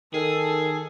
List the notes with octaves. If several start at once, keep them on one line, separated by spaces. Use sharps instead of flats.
D#3 G#4 A4